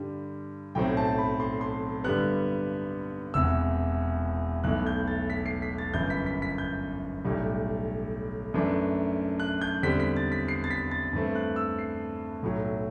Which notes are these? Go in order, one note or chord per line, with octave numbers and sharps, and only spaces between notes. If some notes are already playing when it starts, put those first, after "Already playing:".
Already playing: G2 D3 G3
B1 A2 F#3 C4 G5
A5
B5
C6
C6
G2 D3 G3 B3 F#6
E1 E2 C3 E6
B1 B2 A3 E4 F#6
G6
A6
B6
C7
B6
A6
G1 F#2 E3 G6
B6
B6
B6
G6
B1 A2 G3
F#2 E3 A3 D4
F#6
G6
E2 D3 G3 C4 B6
B6
A6
B6
C7
A6
B6
A6
G2 E3 A3 C4
F#6
E6
C7
B1 A2 F#3